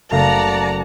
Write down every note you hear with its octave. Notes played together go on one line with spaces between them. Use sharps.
F#1 A3 D5 F5 F#5 A5 A#5